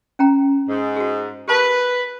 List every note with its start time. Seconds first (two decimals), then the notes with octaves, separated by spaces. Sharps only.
0.19 C#4 G5 A#5
0.68 G#2
0.97 F#4 G#4
1.48 G4 A#4 B4 A5